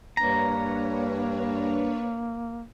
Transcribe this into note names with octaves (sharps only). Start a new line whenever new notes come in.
G2 A#3 D4 B4 C#5 A#5